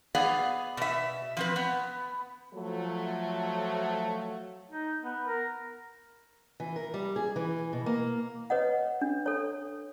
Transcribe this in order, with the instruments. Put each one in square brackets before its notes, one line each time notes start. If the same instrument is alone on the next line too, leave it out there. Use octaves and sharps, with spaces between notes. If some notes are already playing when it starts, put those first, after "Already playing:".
[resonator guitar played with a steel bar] B3 G#4 D5 F5
B2 E5
F3 C4 B4
B3
[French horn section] F3 F#3 A3
[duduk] D#4
B3
A#4
[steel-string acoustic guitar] E3
A#4
G3
G#4
E3
B2
A#3
[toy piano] B4 C#5 D#5 F#5
D4
A4 C#5